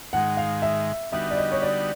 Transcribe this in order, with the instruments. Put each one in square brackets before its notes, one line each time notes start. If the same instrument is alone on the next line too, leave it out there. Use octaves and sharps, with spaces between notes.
[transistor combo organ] G#2 D#3 G#3 [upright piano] F#5
[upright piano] F5
E5
[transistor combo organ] D3 G3 B3 D#4 F#4 [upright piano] E5
[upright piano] D5
D#5
C#5
D5